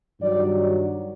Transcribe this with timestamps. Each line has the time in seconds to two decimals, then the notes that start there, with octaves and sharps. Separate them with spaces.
0.21 G2 D#3 F#3 D5